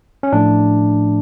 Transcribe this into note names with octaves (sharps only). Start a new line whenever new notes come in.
C#4
A2 F3 A3 D4